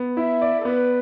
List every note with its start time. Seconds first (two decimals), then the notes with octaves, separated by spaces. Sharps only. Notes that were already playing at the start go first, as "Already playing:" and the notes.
Already playing: B3
0.17 E4 E5
0.42 D5
0.60 A4
0.65 B3 B4